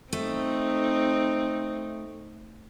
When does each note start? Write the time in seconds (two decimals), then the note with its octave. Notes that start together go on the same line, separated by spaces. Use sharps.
0.13 A3 C4 D#4